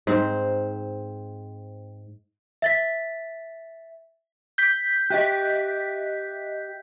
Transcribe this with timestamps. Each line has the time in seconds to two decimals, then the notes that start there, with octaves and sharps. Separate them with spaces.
0.07 G#2 C4
2.62 E5 A6 B6
4.58 G6 B6
5.10 G4 D#5 E5 F#6